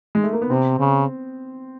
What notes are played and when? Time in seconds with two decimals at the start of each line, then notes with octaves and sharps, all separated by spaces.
0.15 G#3
0.23 A3
0.33 A#3
0.42 B3
0.50 C3 C4
0.79 C#3